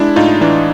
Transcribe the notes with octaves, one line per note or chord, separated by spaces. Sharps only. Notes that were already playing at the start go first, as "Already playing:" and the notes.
Already playing: G#3 D4 E4
A2 D#4 F4
E3 D4